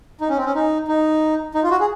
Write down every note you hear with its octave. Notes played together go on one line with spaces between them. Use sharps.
D#4
C#4
C4
C#4
D#4
D#4
D#4
F4
F#4
G#4